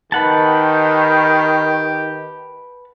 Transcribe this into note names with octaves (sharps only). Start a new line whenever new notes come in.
D#3 G4 B4 F#5 A5